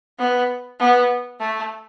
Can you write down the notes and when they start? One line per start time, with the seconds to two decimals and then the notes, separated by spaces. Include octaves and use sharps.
0.19 B3
0.80 B3
1.40 A3